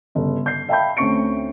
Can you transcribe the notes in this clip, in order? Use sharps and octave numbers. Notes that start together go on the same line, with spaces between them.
G1 C#3
G6 C7
E5 F5 G5 A5 B5 G6
D2 C4 C#4 C#6 C#7 D7